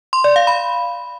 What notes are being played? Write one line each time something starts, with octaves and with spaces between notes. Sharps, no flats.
C6
D5
F5
B5